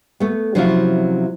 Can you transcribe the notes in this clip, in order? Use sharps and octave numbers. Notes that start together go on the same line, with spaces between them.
A3 B3
C3 F3 F#3 C#4 E4 F4